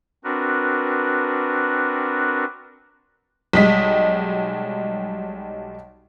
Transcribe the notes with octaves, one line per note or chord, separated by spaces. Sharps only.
C4 D4 F#4 A#4 B4
B1 G3 G#3 D#5 B6